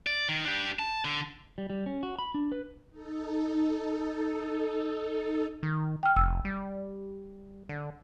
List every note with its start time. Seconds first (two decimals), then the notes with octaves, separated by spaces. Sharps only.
0.07 D5
0.28 D#3
0.45 D4 G4
0.79 A5
1.05 D3
1.58 G3
1.70 G3
1.86 C#4
2.03 F#4
2.19 B5
2.34 D4
2.52 B4
2.91 D#4 A4
5.63 D#3
6.03 G5 F6
6.16 F1 E6
6.45 G3
7.69 D3